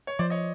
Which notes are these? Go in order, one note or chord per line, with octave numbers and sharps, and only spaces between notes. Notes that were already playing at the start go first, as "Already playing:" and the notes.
C#5
F3 C5 D5
C#5 D#5